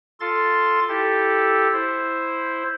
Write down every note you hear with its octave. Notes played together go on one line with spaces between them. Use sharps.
F4 A4 C6 A6
E4 G4 A4
E4 C5